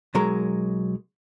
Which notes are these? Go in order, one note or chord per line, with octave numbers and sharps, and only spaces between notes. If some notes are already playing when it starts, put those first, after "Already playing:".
B1 F#3 G#3 A#4